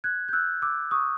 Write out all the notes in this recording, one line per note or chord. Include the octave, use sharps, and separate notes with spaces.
F#6 G#6
G6
E6 F#6
D6 E6
C#6 D#6